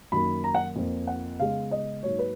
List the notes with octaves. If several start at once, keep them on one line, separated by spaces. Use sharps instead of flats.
F#2 D#3 F#3 A#3 B5
A#5
F#5
F2 F3 A#3
F#5
C#3 G#3 B3 F5
D#5
G#2 F#3 A#3 C#5
B4